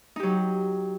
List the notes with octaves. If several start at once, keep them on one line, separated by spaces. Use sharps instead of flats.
F#3 D#4 G4